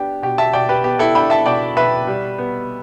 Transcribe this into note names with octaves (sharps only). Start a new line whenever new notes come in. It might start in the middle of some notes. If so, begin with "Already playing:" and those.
Already playing: B3 D4 G4
B2 G4
E5 A5
B2 D5 G5
G4 B4
B3 G4
E4 A4
D4 G5 B5
E5 A5
B2 D5 G5
B2 B4 E5
G3
B3